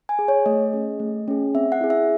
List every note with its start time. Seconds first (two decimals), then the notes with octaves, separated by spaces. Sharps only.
0.09 G#5
0.19 G#4
0.28 C#5
0.46 A3 D#5
0.73 C#4 G#4
1.00 A3
1.28 C#4 G#4
1.55 C4 E5
1.72 F#5
1.81 E4 G#4
1.90 E5